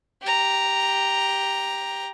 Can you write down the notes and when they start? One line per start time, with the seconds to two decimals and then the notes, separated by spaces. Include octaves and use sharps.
0.22 G4 A#5